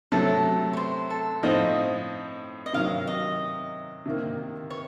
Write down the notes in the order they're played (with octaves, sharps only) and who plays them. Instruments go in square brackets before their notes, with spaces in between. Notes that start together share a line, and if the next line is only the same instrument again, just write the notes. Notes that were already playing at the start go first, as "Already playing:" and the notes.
[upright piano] C3 F#3 A3 [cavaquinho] A4
[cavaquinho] C#5
C5
A4
[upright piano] A2 F3 C4 D#4 [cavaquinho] D#5
[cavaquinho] D#5
[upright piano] C3 D#3 F#3 [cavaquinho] F5
[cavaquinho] D#5
[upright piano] C3 D#3 A#3
[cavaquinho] C#5